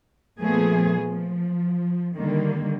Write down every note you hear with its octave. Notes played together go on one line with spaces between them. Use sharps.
A#2 F3 A3 B3 G#4
F3
D3 D#3 G3 A#3